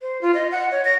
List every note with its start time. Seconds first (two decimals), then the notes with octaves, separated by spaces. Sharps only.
0.02 C5
0.21 F4
0.34 D#5
0.52 F#5
0.72 C#5
0.85 A#6